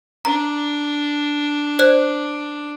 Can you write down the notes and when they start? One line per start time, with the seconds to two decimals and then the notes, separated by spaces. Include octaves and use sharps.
0.25 D4 A#5
1.79 C5 D5 F#6